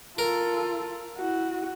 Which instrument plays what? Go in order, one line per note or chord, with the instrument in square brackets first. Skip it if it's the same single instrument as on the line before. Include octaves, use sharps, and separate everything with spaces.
[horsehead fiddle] F4 A4 [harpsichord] A#4
[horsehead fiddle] E4 F#4